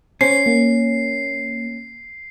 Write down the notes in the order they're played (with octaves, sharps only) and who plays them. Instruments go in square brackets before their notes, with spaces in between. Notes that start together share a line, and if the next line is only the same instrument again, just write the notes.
[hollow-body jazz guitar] C#4 [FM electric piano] C5 [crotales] C7
[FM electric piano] A#3